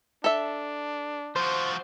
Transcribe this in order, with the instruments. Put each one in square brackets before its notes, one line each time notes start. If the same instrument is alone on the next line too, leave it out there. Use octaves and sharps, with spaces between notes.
[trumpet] D4 [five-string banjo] A4 E5
[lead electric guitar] F3 F#4 [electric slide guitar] C5